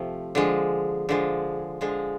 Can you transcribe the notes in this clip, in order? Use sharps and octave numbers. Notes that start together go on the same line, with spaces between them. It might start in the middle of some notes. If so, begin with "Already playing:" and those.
Already playing: C3 F3 A3
D3 F3 G#3
D3 F3 G#3
D3 F3 G#3